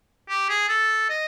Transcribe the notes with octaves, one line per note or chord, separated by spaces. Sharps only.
G4
G#4
A4
D#5